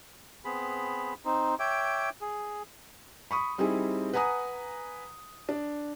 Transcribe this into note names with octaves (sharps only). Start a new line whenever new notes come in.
B3 C4 G#4 B5
C4 D#4
C#5 E5 G5 D6
G#4
B5 C#6 D#6
G3 C4 D#4 E4 G#4
B4 F#5 G#5 A#5 D#6
D4